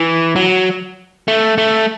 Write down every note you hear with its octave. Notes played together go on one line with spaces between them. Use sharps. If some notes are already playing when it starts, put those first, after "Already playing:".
Already playing: E3
F#3
A3
A3